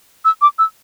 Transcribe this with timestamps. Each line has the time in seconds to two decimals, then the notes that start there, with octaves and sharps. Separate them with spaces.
0.25 E6
0.42 D6
0.59 E6